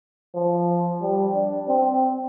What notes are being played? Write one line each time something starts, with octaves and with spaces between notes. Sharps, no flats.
F3
G3
D4
C4